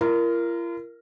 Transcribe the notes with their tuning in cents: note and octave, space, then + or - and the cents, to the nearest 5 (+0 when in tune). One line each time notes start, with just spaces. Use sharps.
F4 -45 A#4 +0